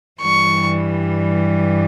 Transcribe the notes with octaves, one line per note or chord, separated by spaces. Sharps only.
G2 E3 G3 C#6